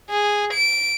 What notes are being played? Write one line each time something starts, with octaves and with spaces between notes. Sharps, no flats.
G#4
D7